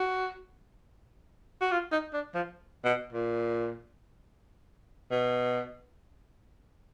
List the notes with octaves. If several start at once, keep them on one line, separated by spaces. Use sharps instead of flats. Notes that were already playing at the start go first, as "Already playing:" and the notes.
Already playing: F#4
F#4
F4
D#4
D4
F3
B2
A#2
B2